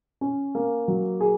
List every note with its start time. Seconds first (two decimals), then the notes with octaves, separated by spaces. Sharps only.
0.21 C#4
0.55 A#3
0.88 F#3
1.21 G#4